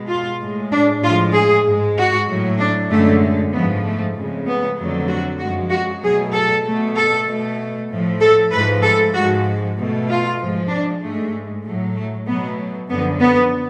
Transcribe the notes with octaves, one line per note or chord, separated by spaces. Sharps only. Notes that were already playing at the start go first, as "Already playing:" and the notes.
Already playing: B2 G#3
F4
A2 G#3
D4
A2 F3 G#3 F4
G#4
G#2 G#3
F#4
A2 F#3 A3
D4
F#2 D3 G#3 A3
G#2 F3 A3 B3
A3
F2 C#3 G#3
B3
F2 D3 F#3 A3
F#4
F#2 F3 G#3 F#4
F#4
B2 F#3 A3 G#4
A4
B2 A3
A4
B2 A3
A2 F3 A3
A4
G#2 F3 A3 B4
A4
G#2 F3 G#3 F#4
B2 A3
F4
G#2 F3 G#3
D4
G#2 G#3 A3
A2 F#3 A3
A3
B2 F#3 A3 B3
F#2 D3 F3 B3
B3